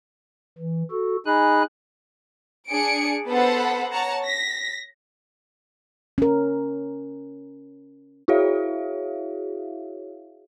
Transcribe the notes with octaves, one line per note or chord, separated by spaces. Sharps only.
E3
F#4 A4
D#4 G#4 G#5 B5 F#6
D4 G#4 C#7 D7
B3 A4 C5 F#5 A5 B5
C#5 F#5 A5 A#5
A#6 B6
C#4 A#4
E4 F#4 G#4 C#5 E5 F5